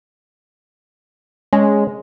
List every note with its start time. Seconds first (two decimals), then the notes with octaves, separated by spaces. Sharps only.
1.53 G#3 C#4